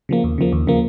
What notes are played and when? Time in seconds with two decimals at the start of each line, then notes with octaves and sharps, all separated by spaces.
0.09 C#3 F3 A#3
0.24 D#2
0.38 C#3 F3 A#3
0.53 D#2
0.67 C#3 F3 A#3